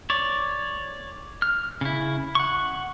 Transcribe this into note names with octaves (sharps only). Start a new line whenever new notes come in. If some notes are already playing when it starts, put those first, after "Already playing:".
C#5 D5
F6
C#3 E4
F#5 C#6